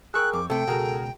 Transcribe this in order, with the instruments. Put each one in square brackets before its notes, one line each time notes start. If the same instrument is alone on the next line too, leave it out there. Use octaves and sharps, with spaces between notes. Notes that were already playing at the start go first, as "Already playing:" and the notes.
[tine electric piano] G#4 A#4 [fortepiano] G5 C#6 E6 [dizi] F#6
[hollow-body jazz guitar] F2 [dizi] D6
[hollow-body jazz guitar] C3 A3 [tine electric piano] A4 [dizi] G5
[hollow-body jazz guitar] C#2 B2 [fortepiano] F#4 G#4 A#4